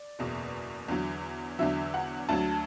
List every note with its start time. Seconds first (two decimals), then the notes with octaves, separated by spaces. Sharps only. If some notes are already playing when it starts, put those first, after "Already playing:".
Already playing: D5
0.19 F#1 E2 B2
0.88 E2 D3 F#3
1.59 E2 D3 F#3 E5
1.94 F#5
2.29 D2 D3 F#3 A5